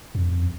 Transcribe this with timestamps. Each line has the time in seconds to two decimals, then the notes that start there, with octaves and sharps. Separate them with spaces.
0.15 F2